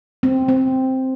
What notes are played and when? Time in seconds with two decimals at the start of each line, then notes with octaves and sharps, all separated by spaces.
0.23 C4
0.48 C4